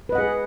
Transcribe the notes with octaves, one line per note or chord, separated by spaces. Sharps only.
G#4 B4 D#5 F#5